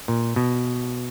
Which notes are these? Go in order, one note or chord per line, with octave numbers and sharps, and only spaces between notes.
A#2
B2